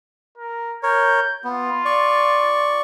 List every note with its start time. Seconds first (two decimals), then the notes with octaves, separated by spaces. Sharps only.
0.38 A#4
0.83 A#4 C#5 G6
1.44 B3 F4
1.85 D5 C#6